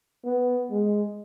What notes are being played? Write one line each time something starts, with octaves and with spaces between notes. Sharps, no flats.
B3
G#3